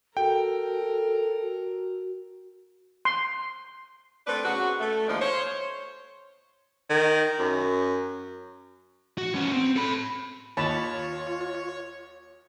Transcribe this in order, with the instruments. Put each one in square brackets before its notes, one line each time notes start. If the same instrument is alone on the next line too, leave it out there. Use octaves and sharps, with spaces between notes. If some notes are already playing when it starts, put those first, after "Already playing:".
[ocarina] F#4 [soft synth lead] A4 [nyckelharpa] A#4 [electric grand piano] G5
[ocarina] F#4
[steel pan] C6
[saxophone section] A3 C4 D4 B4
C#3 F#3 B3 F#4
A3
D#2 F3 G3 G#3 D4 F5
C5 C#5
[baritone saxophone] D#3
F#2
[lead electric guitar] F#4
B3 C#4
C4
A4 B5
[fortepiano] D#2 C#6 [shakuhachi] F4 [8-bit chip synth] C#5 [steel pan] A5 B5